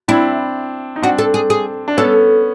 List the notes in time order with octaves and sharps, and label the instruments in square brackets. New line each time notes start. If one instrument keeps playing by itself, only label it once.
[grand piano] C4 D4 [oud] E4
[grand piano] D#4
[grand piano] C4 D4 [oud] F#4
[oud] A4
G#4
G#4
[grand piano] D4
[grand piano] B3 C#4 [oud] A4